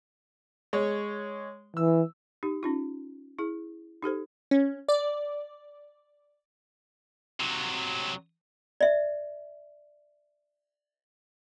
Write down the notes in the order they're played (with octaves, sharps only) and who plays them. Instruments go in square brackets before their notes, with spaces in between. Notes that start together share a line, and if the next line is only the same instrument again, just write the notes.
[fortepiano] G#3 C#5
[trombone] E3 [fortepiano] E6
[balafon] D#4 G4
C#4 D#4 F4
E4 G#4
D#4 G4 A4 C5
[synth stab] C#4
D5
[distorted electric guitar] C3 F#3
[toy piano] D5 E5